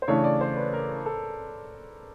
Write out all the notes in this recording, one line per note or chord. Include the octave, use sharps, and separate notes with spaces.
C5
C#3 E3 A3 D4 C#5
D5
C5
B4
A#4
A4